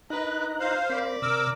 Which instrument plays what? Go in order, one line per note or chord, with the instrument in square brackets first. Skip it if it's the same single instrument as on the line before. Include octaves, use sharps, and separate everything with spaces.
[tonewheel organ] D#4 A#5 F#6 [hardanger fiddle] A#4 B4
[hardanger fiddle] F4 [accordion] C5 F5
[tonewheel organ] C4 A#4 B5 [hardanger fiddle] D5
[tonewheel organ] C3 [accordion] A#4 D6 E6